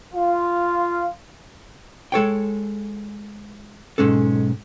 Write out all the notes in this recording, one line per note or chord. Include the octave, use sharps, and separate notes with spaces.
F4
G#3 A4 C#5 G5
B1 G#2 G#3 C#4 A4